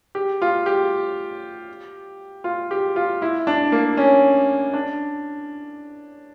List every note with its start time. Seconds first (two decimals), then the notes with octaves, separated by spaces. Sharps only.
0.15 G4
0.42 F4
0.66 G4
2.44 F4
2.71 G4
2.96 F4
3.22 E4
3.47 D4
3.72 A#3
3.97 C#4
4.74 D4